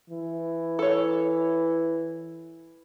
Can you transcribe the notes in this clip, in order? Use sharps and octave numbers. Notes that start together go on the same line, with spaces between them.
E3
A4 C#5